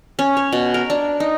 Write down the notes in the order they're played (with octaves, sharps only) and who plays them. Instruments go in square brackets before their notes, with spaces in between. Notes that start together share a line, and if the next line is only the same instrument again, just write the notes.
[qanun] C#4
C#5
B2
A#4
D4
D#4